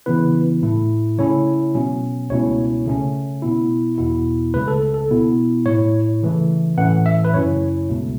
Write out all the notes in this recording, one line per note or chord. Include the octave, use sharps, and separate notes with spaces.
C#3 E3 B3 E4 B4
A2 A3 E4
C#3 A3 C#4 E4 C#5
B2 F#3 C#4
C#2 B2 A3 C#4 E4 C#5
C#3 A3 C#4
B2 B3 E4
E2 B2 B3 E4
C#2 C#3 A3 B4
A4
A4
B2 B3 E4
A2 A3 E4 C#5
C#3 E3 A3
A2 E3 A3 C#4 F#5
E5
B4
F#2 C#3 F#3 C#4 E4 C#5
C#2 B2 A3